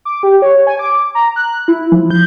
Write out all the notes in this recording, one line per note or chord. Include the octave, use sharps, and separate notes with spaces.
D6
G4
C#5
G#5
D6
A#5
F#6
E4
F3
G6